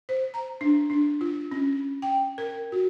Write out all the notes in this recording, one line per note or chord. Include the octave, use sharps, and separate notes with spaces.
C5
A#5
D4
D4
F4
C#4
G5
A#4
F#4